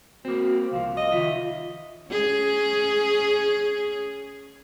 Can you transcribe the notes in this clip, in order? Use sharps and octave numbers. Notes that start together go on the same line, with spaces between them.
A#3 C4 F#4
C2 F3 F5
D#5
D#3 F4 E5
C#4 G#4